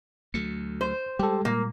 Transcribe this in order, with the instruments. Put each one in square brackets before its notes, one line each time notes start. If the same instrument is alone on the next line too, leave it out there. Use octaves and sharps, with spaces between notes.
[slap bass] D2 F#3 A3 [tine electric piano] C#7
[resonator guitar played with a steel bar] C5
[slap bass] G3 G#3 [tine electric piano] G4 A4
[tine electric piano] A#2 [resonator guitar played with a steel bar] A#3